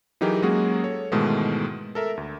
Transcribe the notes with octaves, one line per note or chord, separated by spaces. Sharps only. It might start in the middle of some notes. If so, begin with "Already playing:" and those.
E3 F#3 D#4 G4 G#4 A#4
F#3 G#3 A#3 C#4 F#4 G#4
A4 C#5
G#2 B2 D#3 E3 G#3 A3
A4 A#4 E5
D2